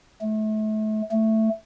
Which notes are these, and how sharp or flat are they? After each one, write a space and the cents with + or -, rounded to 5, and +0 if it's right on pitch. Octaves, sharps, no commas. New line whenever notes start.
A3 -30
A3 +5